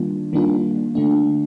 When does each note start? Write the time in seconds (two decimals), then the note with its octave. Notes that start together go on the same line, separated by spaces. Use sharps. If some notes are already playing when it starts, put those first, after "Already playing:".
Already playing: D#3 G3 A#3 D4 F4
0.33 D#3 G3 A#3 D4 F4
0.95 D3 A3 D4